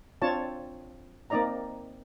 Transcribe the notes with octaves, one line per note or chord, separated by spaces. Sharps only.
C4 D4 F4 C#5 A5
A#3 C4 D#4 D5 D#5 A#5